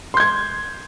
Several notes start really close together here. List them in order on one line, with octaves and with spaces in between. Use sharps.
C6 G6 G#6